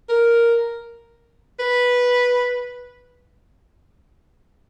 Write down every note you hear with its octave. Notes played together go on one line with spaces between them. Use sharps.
A#4
B4